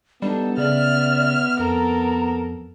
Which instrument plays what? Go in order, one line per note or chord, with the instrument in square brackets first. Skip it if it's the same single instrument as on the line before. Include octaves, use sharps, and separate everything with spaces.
[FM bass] G3 [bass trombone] B3 [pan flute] D4 [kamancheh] D#4 A4
[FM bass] C#3 [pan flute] D5 [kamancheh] E5 F6
[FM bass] F2 [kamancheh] A4 A#4 [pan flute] A#5